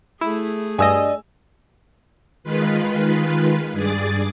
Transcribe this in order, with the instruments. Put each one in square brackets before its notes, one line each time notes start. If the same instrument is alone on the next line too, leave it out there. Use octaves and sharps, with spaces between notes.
[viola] A3 G#4 [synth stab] E4
[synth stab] G2 D#5 [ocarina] D5 [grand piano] G#5 D#6 E6
[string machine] D#3 G#3 F4 B4
G2 G#4 D5 A6